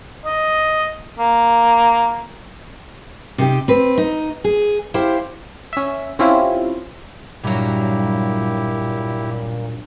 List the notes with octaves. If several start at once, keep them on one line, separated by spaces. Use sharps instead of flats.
D#5
A#3
C3 D#4 G4
C4 B4
D#4
G#4
E4 G4 C5 F5
C#4 E5
C4 C#4 E4 F4 G4
G2 A#2 F#3 E4 G4